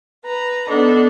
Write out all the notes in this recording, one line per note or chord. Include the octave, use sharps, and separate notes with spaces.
B4 A#5
B3 D4 D#4 A4